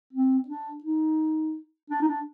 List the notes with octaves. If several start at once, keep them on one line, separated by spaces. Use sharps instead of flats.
C4
D4
D#4
D4
D#4
D4